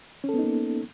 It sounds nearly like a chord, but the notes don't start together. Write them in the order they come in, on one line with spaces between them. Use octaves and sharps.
C#4 A4 B3 D#4 A#3